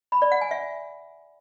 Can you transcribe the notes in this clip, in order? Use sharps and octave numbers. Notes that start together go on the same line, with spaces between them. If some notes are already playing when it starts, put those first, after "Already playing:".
B5
D5
F#5
G#5
E5